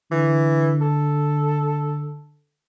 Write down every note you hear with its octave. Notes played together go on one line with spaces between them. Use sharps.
D3 E3
A4